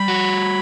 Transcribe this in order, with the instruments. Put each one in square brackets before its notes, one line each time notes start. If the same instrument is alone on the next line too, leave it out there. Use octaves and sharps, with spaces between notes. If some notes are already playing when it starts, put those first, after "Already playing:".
Already playing: [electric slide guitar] G3 [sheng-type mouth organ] B5
[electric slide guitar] F#4